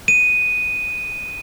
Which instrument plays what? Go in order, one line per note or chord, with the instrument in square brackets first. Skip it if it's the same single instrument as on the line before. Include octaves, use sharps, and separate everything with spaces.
[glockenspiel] D#7